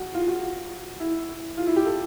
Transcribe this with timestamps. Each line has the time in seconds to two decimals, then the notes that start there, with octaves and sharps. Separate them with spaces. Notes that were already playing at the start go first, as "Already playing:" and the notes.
Already playing: F#4
0.14 F4
0.28 F#4
1.00 E4
1.57 F4
1.67 E4
1.76 G4
1.86 A4